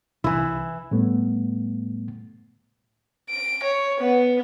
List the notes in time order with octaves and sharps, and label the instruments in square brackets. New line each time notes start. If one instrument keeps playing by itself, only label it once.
[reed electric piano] C2 [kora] E3 E4
[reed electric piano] A2 G3 A3 B3
[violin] D7
C#5
B3